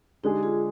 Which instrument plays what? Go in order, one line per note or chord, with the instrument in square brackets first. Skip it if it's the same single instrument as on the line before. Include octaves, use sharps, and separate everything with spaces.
[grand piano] D3 G#3 D4 G#4 [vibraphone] D#4 G4
[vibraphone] F4 G#4